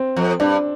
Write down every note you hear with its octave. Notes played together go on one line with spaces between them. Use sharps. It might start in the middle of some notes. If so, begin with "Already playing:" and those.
Already playing: C4
F2
G2 D4